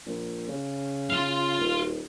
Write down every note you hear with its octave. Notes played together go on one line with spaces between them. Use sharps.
A#1
C#3
F4 F5
D#1